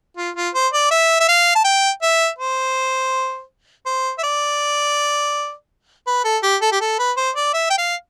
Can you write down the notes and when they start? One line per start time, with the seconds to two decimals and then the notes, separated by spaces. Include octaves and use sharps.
0.17 F4
0.36 F4
0.54 C5
0.73 D5
0.91 E5
1.20 E5
1.28 F5
1.55 A5
1.64 G5
2.02 E5
2.39 C5
3.86 C5
4.18 E5
4.23 D5
6.07 B4
6.25 A4
6.43 G4
6.61 A4
6.72 G4
6.81 A4
6.99 B4
7.17 C5
7.36 D5
7.54 E5
7.70 G5
7.78 F5